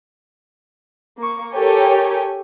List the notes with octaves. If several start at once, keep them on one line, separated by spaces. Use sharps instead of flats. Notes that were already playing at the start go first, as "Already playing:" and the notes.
A#3 C#6
G4 A4 A#4 C#5 G5 G#5